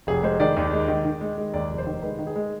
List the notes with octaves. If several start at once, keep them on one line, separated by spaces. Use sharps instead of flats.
F1 G#4
G#3 C5
D#3 D5
D#2
G#3
D#3
D#3
G#3
G#3
D#2 D5
F1
C5
D#3
G#3 B4
D#3
G#4
G#3